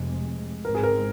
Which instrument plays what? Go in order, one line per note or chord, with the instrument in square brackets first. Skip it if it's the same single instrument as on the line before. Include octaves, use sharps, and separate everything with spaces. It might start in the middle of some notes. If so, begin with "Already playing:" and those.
Already playing: [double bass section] F1 F2 C3 G#3
[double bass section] G#1 G#2 G#3 C4 [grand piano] A#4
[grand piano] G#4
A#4